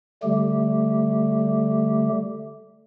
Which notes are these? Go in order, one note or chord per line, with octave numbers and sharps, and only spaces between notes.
D3 G3 A3 G4